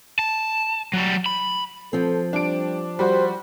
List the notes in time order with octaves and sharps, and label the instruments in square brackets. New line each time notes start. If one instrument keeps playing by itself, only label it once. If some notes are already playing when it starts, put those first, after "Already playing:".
[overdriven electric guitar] A5
F#3 G3
B5
[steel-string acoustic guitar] F3 C4 [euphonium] A4
[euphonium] G3 [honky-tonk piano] D4 D7
[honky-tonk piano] G3 F#4 [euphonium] G4 [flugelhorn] C5